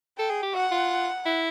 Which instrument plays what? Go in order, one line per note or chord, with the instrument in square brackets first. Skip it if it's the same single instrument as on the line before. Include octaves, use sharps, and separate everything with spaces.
[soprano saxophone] A4 [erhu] G5
[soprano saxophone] G#4
G4
[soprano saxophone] F#4 [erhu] F#5
[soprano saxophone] F4
E4